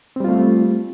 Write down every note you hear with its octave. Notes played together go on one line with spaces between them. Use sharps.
G3 A3 C4 F4